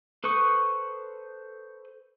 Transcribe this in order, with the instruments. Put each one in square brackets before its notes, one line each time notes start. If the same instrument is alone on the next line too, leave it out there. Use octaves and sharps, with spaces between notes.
[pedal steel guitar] A4 B4 C5 C#6 D#6